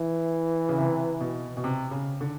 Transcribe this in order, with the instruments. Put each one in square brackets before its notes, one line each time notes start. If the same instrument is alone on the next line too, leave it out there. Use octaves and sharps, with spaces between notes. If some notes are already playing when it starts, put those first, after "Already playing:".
Already playing: [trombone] E3
[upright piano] C#3
C3
B2
B2
C3
C#3
D3